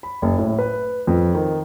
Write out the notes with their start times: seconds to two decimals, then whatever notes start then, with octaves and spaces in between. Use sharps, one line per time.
0.03 B5
0.22 F#1
0.38 A2
0.59 B4
1.07 F2
1.35 D#3